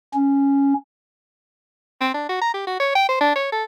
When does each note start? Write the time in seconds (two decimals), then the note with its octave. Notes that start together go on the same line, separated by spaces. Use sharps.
0.14 C#4
2.01 C4
2.14 D4
2.29 F#4
2.41 A#5
2.54 G4
2.67 F#4
2.80 C#5
2.95 G5
3.09 C5
3.21 D4
3.36 C#5
3.52 A4